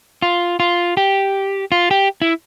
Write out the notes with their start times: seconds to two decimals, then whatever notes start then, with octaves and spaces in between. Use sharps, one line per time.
0.22 F4
0.60 F4
0.97 G4
1.72 F4
1.91 G4
2.22 E4